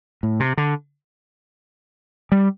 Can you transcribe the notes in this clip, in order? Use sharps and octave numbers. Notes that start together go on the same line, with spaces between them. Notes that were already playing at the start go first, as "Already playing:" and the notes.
A2
C3
D3
G3